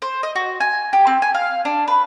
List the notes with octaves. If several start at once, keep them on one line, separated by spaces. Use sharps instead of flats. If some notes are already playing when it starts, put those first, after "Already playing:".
C5
D#5
F#4
G#5
G4
C4
G#5
F5
D4
B4